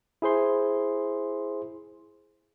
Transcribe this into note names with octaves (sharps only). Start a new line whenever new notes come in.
E4 G#4 C5 C6